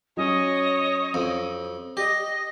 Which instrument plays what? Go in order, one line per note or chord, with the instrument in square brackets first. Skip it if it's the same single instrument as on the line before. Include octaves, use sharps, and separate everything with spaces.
[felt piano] F#3 C#4 [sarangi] C#5 [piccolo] D#5
[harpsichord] F2
[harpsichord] G4 [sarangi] D#5 [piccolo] A#6